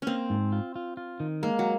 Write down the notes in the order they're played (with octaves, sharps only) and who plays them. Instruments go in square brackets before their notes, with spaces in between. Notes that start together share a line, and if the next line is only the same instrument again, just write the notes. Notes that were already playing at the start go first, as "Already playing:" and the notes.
[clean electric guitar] A#3 [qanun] C4 C#4
[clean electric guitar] G#2
F4
F4
F4
D#3
[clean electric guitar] G#3 [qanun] A#3
[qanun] F#3